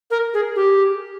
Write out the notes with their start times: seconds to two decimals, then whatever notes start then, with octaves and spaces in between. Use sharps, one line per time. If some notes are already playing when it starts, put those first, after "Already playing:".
0.11 A#4
0.34 G#4
0.56 G4